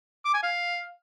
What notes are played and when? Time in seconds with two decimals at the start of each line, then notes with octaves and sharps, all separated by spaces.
0.25 D6
0.34 G#5
0.43 F5